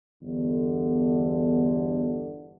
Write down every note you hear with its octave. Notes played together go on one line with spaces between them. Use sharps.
G1 E2 D3